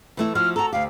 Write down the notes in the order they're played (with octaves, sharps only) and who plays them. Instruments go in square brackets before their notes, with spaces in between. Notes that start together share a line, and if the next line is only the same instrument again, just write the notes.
[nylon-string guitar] E3 A3 E4
[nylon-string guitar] F3 E4 F#4 [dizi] F6
[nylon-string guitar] F#4 A4 [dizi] A#5
[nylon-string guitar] D2 G4 [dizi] F5